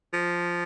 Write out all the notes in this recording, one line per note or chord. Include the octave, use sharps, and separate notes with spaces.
F3